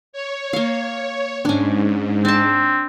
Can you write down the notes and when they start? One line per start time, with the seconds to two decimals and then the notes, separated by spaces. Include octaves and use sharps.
0.13 C#5
0.53 A#3 F5
1.45 G#2 C#4 D4
2.25 C4 D4 A5